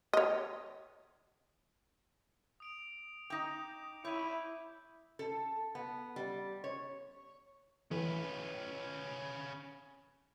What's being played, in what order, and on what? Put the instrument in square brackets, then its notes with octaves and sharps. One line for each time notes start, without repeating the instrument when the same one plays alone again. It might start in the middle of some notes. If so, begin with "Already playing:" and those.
[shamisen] C#5 D#5
[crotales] D#6 D7 F7
[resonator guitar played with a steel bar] D#4 G5 [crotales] D6 D#6 G6
[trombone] E4 [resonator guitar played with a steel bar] C#5 [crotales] G6 D#7
[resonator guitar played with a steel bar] A4
B3
G3
C#5
[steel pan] E3 [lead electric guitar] C#4 B4